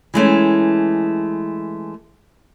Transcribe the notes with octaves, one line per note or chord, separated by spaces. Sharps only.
E3 G#3 A3 C#4